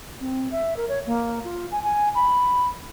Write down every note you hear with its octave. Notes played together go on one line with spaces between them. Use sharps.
C4
E5
A#4
C#5
A#3
F4
G#5
G#5
B5